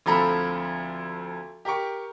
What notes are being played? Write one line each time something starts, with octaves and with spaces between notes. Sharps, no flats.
D2 F3 C4 A4 A#5 B5
G4 A#4 G5 C#6